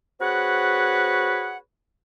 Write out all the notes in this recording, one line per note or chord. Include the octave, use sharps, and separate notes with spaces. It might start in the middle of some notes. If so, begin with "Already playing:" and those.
C4 F#4 G#4 B4 C#5 F#5